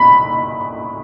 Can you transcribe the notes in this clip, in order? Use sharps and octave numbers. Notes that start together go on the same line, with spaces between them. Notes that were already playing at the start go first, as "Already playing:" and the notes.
Already playing: B5